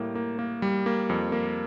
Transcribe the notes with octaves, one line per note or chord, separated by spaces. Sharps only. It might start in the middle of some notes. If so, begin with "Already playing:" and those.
Already playing: A2 G3 A#3
A#3
A#3
G3
A#3
F2
A#3